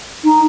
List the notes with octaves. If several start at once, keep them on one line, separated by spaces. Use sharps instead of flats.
D#4